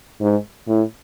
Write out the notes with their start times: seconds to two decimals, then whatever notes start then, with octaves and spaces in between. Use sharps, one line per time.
0.21 G#2
0.68 A2